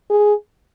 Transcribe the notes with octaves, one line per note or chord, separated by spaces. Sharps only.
G#4